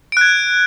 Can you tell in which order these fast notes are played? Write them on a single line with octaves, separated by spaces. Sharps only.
D7 F#6 G#6